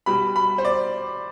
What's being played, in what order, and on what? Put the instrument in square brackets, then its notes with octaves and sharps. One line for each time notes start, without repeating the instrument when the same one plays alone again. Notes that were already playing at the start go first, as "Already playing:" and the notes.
[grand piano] B2 G3 B5
B5
C5
D5